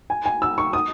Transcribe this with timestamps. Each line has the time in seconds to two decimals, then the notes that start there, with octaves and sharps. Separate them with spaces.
0.10 G#5
0.26 G#5
0.42 E6
0.58 C#6
0.73 D#6